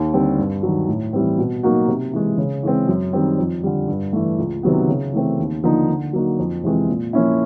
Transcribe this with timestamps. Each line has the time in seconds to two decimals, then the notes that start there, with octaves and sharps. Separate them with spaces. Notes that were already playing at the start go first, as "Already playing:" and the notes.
Already playing: D#2
0.14 D3 G3 C4
0.38 G2
0.63 D#3 F#3
0.88 A2
1.13 E3 G3 C4
1.38 B2
1.63 F#3 A#3 D#4 F#4
1.88 C3
2.13 E3 G#3
2.38 C#3
2.63 E3 G#3 C4
2.88 F#2
3.13 D#3 G3 C4
3.38 F2
3.63 D3 G3
3.88 G2
4.13 E3 A3
4.38 C#2
4.63 C3 D#3 F#3 B3
4.88 C#3
5.13 E3 A3 C4
5.39 D#2
5.63 D3 F3 A#3 D#4
5.89 D3
6.13 F#3 A#3 D#4 F#4
6.39 F2
6.63 C3 E3 G#3 C4
6.89 A#2
7.13 F3 A#3 C#4 E4